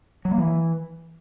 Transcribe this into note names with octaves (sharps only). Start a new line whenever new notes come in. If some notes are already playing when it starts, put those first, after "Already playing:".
F#3
A#3
E3